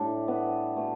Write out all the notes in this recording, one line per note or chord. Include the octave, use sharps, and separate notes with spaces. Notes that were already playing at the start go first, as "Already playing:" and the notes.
Already playing: A2 G3 A3 D4
B3
B2 A3